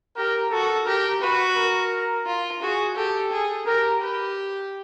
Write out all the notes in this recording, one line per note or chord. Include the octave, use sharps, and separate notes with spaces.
G4 A#4
F#4 A4
G4 A#4
F#4 B4
A#4
F4
F#4 G#4
G4 A4
G#4
G4 A#4
G4 B4